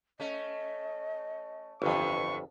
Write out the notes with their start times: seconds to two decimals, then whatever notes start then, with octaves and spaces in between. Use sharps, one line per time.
0.20 A3 C#4 D#5
1.82 G1 F2 A2 D3 E3 C#6